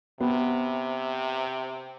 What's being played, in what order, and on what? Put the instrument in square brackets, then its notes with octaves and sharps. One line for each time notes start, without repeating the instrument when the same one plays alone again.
[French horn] C3 [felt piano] B3